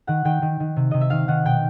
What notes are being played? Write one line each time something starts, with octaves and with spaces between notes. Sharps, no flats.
D#3 F#5
D#3 G5
D#3
D#3
C3
C3 D#5
E5
D#3 F5
D#3 F#5
B2 G5